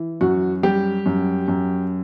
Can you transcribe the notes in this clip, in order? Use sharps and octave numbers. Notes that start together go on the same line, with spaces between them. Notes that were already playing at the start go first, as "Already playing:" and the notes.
Already playing: E3
F#2 F#4
G3 G4
F#2
F#2